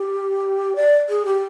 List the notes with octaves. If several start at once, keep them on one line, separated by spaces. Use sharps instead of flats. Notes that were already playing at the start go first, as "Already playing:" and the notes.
Already playing: G4
D5
G#4
G4